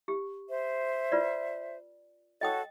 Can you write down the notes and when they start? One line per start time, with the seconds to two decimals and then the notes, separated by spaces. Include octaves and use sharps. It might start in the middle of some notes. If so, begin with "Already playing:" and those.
0.08 G4
0.49 C5 E5
1.12 F4 B4 D5
2.41 F#4 A4 C#5 D#5 G5 D#6